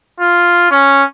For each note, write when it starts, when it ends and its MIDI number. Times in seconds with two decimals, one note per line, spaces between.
0.20 0.67 65
0.71 1.03 61